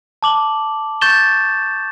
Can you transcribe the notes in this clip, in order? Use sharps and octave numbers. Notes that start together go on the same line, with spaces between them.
A5 D6 F#7 G7
C#6 G6 A6 E7 G7